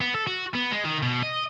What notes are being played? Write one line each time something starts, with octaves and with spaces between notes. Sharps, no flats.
B3
A4
F#4
B3
G#3
D#3
B2
D#5